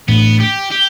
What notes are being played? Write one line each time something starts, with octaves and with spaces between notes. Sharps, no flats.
A2 E3 A3 B3 D4
G4
G4